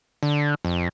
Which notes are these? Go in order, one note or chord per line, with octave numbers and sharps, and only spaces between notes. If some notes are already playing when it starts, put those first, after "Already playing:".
D3
F2